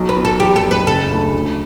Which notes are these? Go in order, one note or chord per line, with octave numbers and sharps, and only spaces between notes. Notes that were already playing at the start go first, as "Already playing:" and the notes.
Already playing: B1 F#3
B4
B3
A4
E2 G4
A4
F#1
B4
C#3 A4
D2
D2